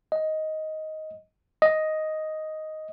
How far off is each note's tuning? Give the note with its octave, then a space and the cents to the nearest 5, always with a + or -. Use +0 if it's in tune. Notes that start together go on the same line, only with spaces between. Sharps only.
D#5 +10
D#5 +5